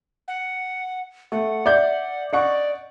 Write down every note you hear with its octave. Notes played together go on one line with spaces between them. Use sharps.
F#5
A3 F#5
D5 E5 G6
D5 D#5 F#5 C#6